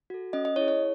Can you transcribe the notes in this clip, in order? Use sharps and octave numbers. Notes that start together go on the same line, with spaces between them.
F#4 A4
C#4 D#5
D#5
E4 G#4 C#5
C#5